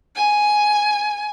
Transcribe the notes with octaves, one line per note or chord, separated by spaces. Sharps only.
G#5